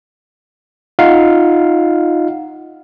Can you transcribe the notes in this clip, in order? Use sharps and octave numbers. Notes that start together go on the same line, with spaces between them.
D#4 F4 F5 F#5